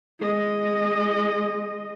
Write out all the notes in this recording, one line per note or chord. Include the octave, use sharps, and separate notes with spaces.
G#3 D#5